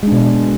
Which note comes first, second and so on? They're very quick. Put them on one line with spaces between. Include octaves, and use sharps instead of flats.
G#3 D4 B2